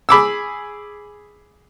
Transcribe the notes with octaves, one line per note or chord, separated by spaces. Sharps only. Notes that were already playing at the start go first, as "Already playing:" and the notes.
G#4 B5 D6 E6